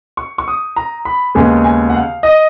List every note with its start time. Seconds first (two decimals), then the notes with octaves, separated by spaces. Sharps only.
0.17 C#6
0.38 C#6
0.48 D#6
0.76 A#5
1.05 B5
1.35 D#2 C#3 G#3 B3 G#5
1.64 G#5
1.90 F#5
1.94 F5
2.23 D#5